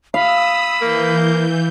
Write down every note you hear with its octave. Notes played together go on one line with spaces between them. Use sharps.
F5 B5 D#6 E6
E3 A#3 G6